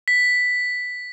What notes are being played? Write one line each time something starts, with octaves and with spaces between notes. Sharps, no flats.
B6